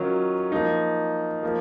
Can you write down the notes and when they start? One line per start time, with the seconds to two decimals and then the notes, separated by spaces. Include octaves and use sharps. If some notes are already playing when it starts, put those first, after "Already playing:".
Already playing: D#3 F#3 C#4 F4
0.52 F3 A#3 D#4
1.43 F3 A#3